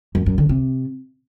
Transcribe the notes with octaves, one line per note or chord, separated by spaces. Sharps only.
F#2
F#2
D3
C3